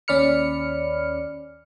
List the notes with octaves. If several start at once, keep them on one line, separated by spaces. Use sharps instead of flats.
D#2 C#4 D5 B5 F6 C#7